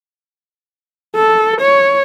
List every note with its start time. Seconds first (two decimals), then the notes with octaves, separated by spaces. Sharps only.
1.16 A4
1.61 C#5